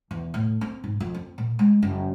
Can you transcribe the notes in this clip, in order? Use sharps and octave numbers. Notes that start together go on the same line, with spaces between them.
E2
A2
C4
G#2
F2
C4
A#2
G#3
F#1